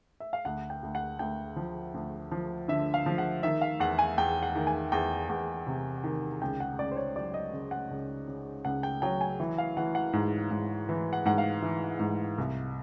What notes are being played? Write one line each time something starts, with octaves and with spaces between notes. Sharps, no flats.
E5
F5
D2 F#5
G5
D2
F#5
D2 G5
F3
D2
F3
D3 E5
F5
F3
F#5
D#3 E5
F5
E2 F#5
G#5
E2 G5
F#5
D#3
G#5
E2 G5
E2
C3
D#3
C#2 G5
F#5
C#2 D5
C5
C#5
F#3 D5
D#5
C#3
F#5
C#2
C#3
C#2 F#5
G5
F#3 G5
G#5
E3
F5
E3 F#5
F#5
G#2
G#2
E3
F#5
G#2 F#5
F5
E3
G#2
C2